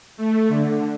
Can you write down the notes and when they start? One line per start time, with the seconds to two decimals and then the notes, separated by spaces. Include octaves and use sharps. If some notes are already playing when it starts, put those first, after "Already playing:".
0.17 A3
0.48 D3